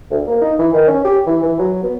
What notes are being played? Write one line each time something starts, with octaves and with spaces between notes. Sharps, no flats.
D2
A#3
D#4
E3
D#3
C#4
G4
E3
E3
F#3
B3